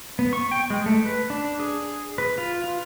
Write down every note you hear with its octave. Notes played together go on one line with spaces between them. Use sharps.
B3
C#6
G5
G#3
A3
B4
D4
G#4
B4
F4
F4